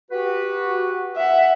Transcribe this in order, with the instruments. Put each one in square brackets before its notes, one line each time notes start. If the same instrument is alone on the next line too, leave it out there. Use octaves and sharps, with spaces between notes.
[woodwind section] F#4 G4 B4
[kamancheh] E5 F#5